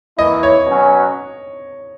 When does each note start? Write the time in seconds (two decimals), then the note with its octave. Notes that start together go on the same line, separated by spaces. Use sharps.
0.18 E3 A#3 E4 D#5
0.43 C#5
0.67 B2 F#3 C#4 F#4